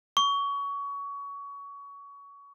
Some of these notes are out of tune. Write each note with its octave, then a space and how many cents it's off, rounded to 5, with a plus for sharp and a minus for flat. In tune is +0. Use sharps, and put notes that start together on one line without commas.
C#6 +25